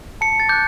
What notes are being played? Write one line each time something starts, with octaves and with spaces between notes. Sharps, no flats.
A5 C#7
A6
D6 F#6 G6